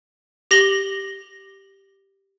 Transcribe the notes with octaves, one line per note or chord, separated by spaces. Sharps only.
G4 A#6 F#7 G7